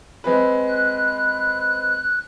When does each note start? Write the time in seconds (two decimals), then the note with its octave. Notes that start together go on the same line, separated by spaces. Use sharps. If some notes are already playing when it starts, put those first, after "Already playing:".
0.24 G#3 C4 B4
0.67 F#6